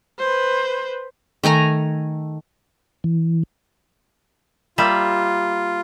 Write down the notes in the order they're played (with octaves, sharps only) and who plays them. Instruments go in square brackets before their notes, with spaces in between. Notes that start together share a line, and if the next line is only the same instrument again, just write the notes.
[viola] B4 C5
[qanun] D#3 A3 G#5 A#5
[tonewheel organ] E3
[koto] G3 A#3 E5 [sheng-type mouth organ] F4